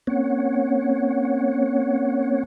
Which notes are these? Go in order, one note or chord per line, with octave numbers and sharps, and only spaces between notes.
A#3 C4 C#4 C#5 F#5